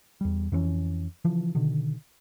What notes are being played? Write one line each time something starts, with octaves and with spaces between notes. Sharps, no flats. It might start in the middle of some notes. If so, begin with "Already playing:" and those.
E2 G3
F2 E3 C4 C#4
C#3 E3 F3
B2 D3 D#3